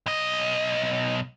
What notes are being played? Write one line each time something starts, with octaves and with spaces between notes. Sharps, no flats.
B1 D#5